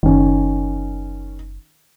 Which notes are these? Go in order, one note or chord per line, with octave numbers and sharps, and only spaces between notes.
F#1 D#3 C#4